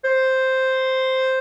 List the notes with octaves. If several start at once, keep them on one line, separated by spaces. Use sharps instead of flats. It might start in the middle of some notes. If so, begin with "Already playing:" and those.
C5